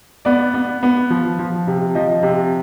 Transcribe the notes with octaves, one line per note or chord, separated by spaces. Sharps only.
B3 D5
B3
B3
F3
F3
C3
F3 D#5
C3